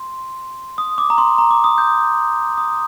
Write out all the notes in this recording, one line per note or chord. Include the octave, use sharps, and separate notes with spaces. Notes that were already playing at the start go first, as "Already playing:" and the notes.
Already playing: C6
D#6
D6
A#5
C6
A#5
D6
D#6
G6
D#6